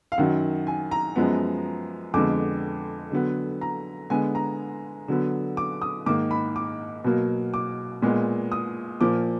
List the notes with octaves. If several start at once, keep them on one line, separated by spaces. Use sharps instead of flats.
F5
F#2 D#3 F#3 F#5
G#5
A#5
F#2 F3 G#3 B3
F2 D3 G#3 B3 D6
D3 F#3 B3
A#5
D3 G#3 B3 G#5
A#5
D3 F#3 B3
D6
D#6
G#2 D#3 A#3 D6
B5
D6
B2 F#3 A#3
D6
A#2 G#3 B3
D#6
A#2 F3 A#3 D6